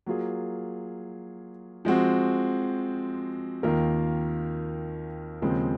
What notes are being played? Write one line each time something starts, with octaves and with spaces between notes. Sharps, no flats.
F#3 A#3 F4 G#4
F3 G#3 C4 F#4
D#2 D#3 A#3 F4 A#4
D#2 C#3 F3 G#3 C4